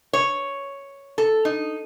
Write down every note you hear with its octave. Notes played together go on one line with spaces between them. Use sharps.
C#5
A4
D#4